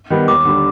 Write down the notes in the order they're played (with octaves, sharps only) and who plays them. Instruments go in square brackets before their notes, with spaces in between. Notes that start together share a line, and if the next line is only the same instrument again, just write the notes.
[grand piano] D#3 G3 B3
[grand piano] D#2 [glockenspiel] D6
[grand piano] D3 G3